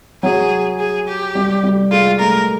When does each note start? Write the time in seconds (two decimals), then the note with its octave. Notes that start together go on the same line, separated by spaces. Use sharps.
0.23 F#3 G#4
0.79 G#4
1.07 G4
1.35 G3
1.63 G3
1.91 G#3 F4
2.19 A3 A#4